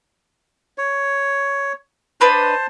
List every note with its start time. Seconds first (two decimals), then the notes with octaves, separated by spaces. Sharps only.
0.78 C#5
2.21 D4 B4 C5 D#5 A5